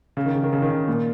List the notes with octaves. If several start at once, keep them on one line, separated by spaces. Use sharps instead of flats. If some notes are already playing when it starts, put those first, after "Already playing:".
C#3
D#3
C#3
D#3
C#3
D#3
C#3
A#2